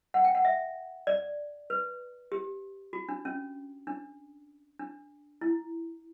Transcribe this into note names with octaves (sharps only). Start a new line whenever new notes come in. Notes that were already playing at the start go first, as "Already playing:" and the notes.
F#5
G5
F#5
E5
D5
B4
G4
F#4
D4
C#4
D4
D4
E4